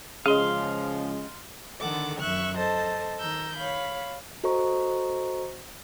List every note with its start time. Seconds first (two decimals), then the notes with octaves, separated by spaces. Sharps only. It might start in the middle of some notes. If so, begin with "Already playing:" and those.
0.26 C#3 F3 G#3 C#4 G#4 D#5 F5 C6
1.79 D3 D#3 A4 F#5 D6
2.18 F#2 E5 C#6 F#6
2.56 A4 C5 D#5 A5
3.19 D#3 A#5 E6 G6
3.55 C#5 F5 B5
4.44 F#4 A4 C5 D#5 A#5 C#6